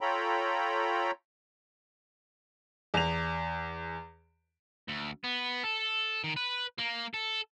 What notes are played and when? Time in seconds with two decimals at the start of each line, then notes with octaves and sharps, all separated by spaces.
0.01 F4 A4 C#5 G5 A#5 B5
2.94 E2 F7
4.88 D2
5.24 B3
5.63 A4
6.24 D#3
6.37 B4
6.79 A#3
7.14 A4